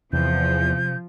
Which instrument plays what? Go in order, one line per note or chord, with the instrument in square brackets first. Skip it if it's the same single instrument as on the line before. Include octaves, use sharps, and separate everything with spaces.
[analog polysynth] E2 [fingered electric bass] C3 [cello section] F3 [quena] G6